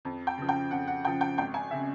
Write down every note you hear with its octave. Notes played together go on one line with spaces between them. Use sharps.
F2
G5
C#3 F3
G5
F2 F#5
F#5
C#3 F3 G5
G5
G#1 G5
G#5
C#3 E5